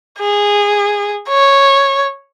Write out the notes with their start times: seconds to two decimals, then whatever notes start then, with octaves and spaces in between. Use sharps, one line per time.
0.19 G#4
1.29 C#5